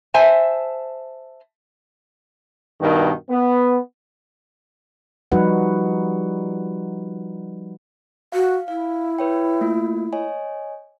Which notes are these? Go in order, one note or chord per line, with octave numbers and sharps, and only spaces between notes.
C5 E5 G#5 A5
G2 B2 D#3
B3
F3 G3 D#4 F#4 B4 F#5
F#4 F5
E4 F5
B4 C#5 G5
A3 A#3 F4
C#5 D#5 G#5